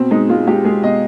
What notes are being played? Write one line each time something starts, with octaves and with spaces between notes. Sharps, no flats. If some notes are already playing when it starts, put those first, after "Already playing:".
Already playing: B2 C4
G#3 D#4
G#3 F4
G#3 G4
G#3 G#4
B2 D#5